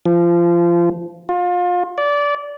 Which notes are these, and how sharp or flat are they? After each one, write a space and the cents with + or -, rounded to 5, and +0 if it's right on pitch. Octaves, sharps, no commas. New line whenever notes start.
F3 -25
F4 +30
D5 -20